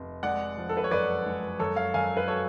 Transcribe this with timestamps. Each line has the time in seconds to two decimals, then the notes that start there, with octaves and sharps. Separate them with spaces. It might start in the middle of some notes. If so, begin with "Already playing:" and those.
Already playing: F1
0.23 G#3 D5 F#5
0.58 F3
0.69 A4
0.77 B4
0.84 C#5
0.91 F#2 B4 D5
1.26 G#3
1.59 F#2 A4 C#5
1.76 C#5 F5
1.94 F#2 F5 G#5
2.17 B4
2.28 F#3 A4 C#5